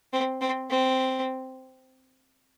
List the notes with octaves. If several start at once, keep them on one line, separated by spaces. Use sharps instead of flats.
C4
C4
C4